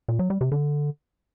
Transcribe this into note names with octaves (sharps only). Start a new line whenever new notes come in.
A#2
F#3
G3
C3
D3